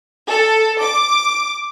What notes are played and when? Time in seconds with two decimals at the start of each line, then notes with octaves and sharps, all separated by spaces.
0.28 A4
0.82 D6